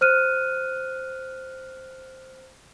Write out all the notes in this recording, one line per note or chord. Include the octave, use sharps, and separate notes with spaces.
C5 F6 F#6 D#7